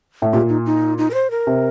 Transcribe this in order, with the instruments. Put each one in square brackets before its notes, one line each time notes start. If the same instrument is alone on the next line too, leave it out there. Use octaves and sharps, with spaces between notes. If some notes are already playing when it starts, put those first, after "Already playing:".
[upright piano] A2
[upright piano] A#2 [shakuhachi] G4
[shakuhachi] D#4
D#4
D#4
A#4
C5
A#4
[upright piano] C3